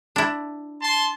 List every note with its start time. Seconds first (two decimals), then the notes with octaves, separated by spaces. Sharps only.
0.16 D4 E4
0.82 A5 C6